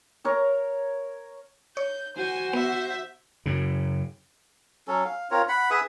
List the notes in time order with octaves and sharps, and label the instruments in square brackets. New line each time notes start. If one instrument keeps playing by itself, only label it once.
[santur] A#4 C#5 A#5
[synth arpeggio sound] C#5 [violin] G6
[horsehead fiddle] F#4 [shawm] C5 [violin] G#5
[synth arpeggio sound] B3 [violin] E5
[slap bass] F#2 C#3
[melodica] F#3 C#4 A4
F5
C4 F4 A#4 C#5
F#5 B5
G#4 B4 E5 D#6